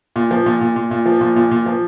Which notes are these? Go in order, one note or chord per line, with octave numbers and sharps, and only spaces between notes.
A#2
F3
A#2
A#2
A#2
A#2
F3
A#2
A#2
A#2
F3